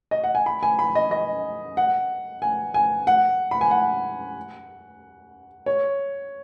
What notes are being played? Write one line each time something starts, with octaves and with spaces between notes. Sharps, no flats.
D#5
F#5
G#5
B5
G#5
B5
D#5
D#5
F#5
G#5
G#5
F#5
B5
G#5
F#5
C#5